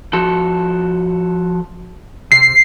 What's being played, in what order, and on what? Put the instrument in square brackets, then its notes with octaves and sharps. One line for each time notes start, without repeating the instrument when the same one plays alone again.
[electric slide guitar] F3 F#4 A4
[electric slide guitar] C3 [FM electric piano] C7